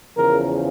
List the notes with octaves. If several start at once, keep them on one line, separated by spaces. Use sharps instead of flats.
E2 C#3 F3 A#4